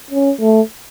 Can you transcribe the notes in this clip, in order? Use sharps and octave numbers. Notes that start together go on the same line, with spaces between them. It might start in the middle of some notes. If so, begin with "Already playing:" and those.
C#4
A3